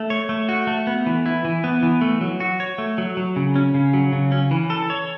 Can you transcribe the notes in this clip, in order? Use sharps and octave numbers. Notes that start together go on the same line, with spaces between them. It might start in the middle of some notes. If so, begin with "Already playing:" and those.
Already playing: A3
C#5
A3
F#4
A3
B3
E3
E4
E3
B3
E3
A3
F#3
F#4
C#5
A3
F#3
F#3
C#3
C#4
C#3
F#3
C#3
C#4
E3
A4
C#5